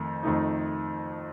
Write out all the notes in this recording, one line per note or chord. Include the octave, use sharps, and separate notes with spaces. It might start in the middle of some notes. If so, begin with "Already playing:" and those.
Already playing: F2 D#3 A3 D#4
F2 D#3 A3 D#4